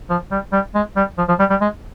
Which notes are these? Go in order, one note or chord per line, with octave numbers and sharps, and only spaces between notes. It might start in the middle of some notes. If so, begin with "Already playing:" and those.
F3
G3
G3
G#3
G3
F3
F3
G3
G3
G#3